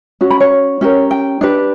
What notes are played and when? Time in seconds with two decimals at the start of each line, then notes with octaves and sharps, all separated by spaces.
0.21 C#4 F#4
0.30 B5
0.40 C#5
0.81 C#4 G4 A#4
1.11 G5
1.41 D4 G4 B4